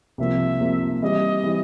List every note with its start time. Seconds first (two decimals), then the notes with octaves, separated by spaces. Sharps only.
0.18 C2 C3 F3 A#3 E5
0.60 C2 C3 F3 A#3
1.02 E3 G3 C4 E4 D#5
1.43 E3 G3 C4 E4